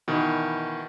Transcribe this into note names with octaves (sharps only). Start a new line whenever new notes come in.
B2 D#3 E3